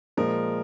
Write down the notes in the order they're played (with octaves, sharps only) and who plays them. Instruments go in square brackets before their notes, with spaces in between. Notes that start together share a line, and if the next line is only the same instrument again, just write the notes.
[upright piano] A#2 F3 G#3 [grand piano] A#4